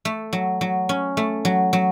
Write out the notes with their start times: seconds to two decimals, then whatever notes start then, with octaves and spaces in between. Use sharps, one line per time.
0.05 A3
0.33 F#3
0.61 F#3
0.89 C#4
1.17 A3
1.45 F#3
1.73 F#3